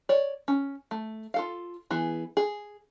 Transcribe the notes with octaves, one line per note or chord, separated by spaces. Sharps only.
C#5 D5
C#4
A3
F4 A4 F5
E3 B3 G#4
G#4